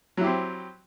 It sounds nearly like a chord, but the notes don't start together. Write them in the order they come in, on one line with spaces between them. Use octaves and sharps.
F#3 E4 G4 C4